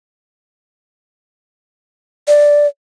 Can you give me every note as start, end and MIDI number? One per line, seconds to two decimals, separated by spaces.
2.28 2.67 74